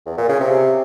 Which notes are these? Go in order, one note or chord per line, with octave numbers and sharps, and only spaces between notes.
E2
A#2
C#3
C3